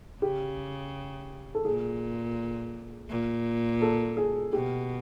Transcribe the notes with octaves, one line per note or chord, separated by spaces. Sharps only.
C#3 G4
A4
A#2 G#4
A#2
A4
G#4
B2 G4